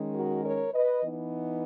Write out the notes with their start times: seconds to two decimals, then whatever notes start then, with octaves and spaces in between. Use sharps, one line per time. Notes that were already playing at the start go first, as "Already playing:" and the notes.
Already playing: D#3 G#3 C#4
0.14 F#4 A#4
0.44 A#4 C#5
0.74 B4 D#5
1.02 E3 B3 D#4